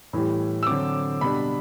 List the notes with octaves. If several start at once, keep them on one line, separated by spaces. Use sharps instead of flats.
A2 E3 G3
E6
D3 F#3 C4 D6
B2 G3 D4 B5